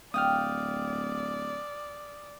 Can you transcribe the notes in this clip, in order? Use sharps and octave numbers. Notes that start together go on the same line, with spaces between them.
D1 D5 F5 G5 D#6 F6